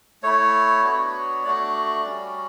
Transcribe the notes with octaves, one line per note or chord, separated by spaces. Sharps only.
A3 E4 C#5
B3 D4 F#4
A3 D4 F#4 D5
G3 C#4 F#4